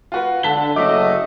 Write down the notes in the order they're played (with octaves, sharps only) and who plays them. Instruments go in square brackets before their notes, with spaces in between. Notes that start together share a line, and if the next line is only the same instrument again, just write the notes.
[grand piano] F4 F#4 B4
[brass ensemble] D3 [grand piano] A5 B6 G7
[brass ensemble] F#1 F#3 D#5 [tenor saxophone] A3 [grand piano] D6